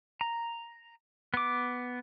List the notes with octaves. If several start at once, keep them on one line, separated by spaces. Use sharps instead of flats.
A#5
B3 D6